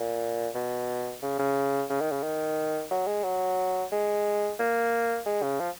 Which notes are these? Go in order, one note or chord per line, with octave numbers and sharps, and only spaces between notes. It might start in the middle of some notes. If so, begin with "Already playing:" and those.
Already playing: A#2
B2
C#3
C#3
C#3
D#3
C#3
D#3
F#3
G#3
F#3
G#3
A#3
G#3
C#3
F3